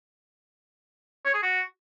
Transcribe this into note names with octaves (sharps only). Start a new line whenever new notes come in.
C#5
G#4
F#4